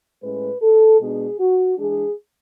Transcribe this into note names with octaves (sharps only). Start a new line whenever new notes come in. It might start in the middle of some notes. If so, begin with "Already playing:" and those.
A2 G#3 C#4 B4
A4
B2 G#3 B3 D4 G#4
F#4
E3 G#3 D4 G#4